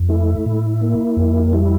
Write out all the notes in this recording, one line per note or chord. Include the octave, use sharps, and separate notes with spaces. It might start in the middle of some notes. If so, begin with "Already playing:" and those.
Already playing: F2
A3 E4
A2
A#3
F2
G3 E4